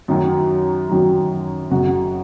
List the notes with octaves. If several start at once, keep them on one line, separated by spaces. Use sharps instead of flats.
F#2 D#3 F#3
F#2 D#3 F#3
F#1 F#2 F#3 F#4